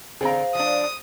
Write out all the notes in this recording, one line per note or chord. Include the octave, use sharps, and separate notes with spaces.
D3 C4 G#4 C5 F5 A#5
F3 D4 D#6